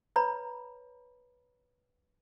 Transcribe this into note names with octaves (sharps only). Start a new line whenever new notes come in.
B4 C#5 A#5 B5